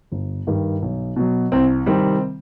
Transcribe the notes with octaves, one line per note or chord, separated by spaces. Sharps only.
G1
G2 D#3 G3
B1
B2 F#3
C2 C4
C3 D#3 G3 C4